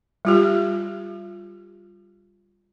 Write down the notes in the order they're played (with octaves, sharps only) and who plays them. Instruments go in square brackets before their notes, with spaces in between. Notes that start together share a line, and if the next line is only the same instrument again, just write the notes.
[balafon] G3 F4 G4